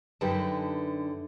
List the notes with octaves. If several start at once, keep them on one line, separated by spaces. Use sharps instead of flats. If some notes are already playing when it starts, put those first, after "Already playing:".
F#2 D3 D#4 G4 B4 A5